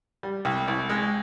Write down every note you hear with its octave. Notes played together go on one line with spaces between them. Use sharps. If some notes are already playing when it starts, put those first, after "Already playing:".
G3
C2
C2
G#3